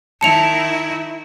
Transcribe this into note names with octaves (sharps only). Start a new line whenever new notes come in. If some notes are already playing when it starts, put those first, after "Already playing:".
D#3 E4 A5 C#7 F7